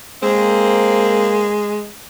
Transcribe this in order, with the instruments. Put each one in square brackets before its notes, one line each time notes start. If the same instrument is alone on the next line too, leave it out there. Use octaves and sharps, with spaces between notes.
[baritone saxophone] G#3 [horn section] A#3 C4